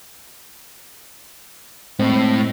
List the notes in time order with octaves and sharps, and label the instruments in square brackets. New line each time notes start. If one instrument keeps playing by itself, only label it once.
[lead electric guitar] A2 [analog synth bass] G#3 [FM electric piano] C4